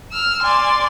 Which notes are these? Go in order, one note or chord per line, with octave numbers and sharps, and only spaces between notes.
E6 F6
D5 G#5 C6